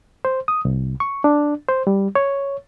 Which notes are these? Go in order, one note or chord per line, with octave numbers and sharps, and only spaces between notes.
C5
D#6
C2
C#6
D4
C5
G3
C#5